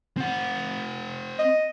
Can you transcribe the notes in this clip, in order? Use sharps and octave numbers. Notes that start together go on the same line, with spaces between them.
C4 F#5
D#5